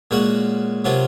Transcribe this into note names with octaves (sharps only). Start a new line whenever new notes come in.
A#2 G#3 C#4 F#4 A#4
C3 F#3 C#4 F4 A#4